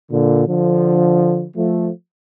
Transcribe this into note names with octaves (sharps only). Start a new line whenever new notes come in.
A#2 D3
D3 F3
F3 A3